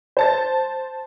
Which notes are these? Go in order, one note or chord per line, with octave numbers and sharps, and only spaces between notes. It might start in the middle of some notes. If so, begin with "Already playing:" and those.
C5 A5 A6